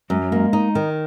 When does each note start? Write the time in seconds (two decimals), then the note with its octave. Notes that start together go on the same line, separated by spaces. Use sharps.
0.10 F#2 G#3
0.21 F#3
0.32 G#3 A#3
0.53 D#4
0.75 D#3